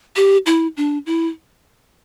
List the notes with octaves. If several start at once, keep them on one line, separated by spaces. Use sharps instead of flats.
G4
E4
D4
E4